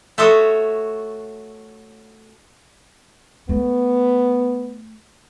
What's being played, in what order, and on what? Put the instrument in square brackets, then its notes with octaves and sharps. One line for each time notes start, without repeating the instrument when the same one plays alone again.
[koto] A3 F#4 C#5 [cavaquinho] E5 C6 D#6
[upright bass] A3 [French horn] B3